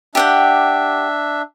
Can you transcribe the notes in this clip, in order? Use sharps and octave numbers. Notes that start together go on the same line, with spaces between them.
D4 G4 E5 F#5 G5